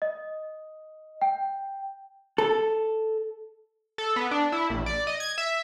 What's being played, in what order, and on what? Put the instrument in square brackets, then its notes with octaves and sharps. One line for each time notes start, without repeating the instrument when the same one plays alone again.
[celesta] D#5
G5
[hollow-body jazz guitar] A4
[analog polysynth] A4
B3
D4
E4
A#1
D5
D#5
G#6
E5